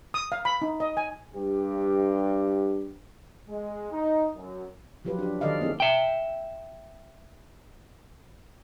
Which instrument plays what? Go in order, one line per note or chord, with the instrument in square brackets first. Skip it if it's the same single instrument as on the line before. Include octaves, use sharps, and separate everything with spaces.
[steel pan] D#6
F5
B5
D#4
D#5
G#5
[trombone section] G2 G4
[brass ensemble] G#3
D#4
F#2
[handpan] F3 F#3 F4 G4 B4
D4 G4
D#3 A4 D5 D#5 F5
A#3 C4 E4 G#4
[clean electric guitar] E5 G5